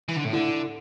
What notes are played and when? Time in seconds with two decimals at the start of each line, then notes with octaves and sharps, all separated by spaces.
0.09 E3
0.16 D3
0.25 A2
0.33 D3 E4